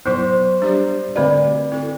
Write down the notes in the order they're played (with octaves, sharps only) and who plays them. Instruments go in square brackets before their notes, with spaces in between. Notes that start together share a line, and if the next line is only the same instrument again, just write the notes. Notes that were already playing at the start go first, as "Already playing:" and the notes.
[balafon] F#3 B3 E4 [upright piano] C5
[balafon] G3 D4 G4 D5
[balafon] D3 A3 C4 F#4 B4 [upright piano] D5
[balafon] C4 E4 A4